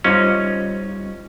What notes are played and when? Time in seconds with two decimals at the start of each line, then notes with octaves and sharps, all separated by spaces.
0.04 G3 C#4 D#4 F4 C5